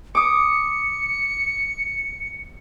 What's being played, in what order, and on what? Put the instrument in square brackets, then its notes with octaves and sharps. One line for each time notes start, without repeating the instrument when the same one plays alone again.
[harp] D6 D#6 [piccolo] C#7